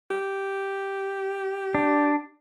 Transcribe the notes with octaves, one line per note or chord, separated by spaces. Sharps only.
G4
D4